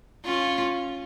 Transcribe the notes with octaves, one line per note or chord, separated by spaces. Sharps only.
C#4 F4